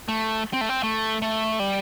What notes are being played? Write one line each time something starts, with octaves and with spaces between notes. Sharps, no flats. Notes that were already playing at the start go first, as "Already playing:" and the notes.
A3
C4
A3
C4
A3
A3
G3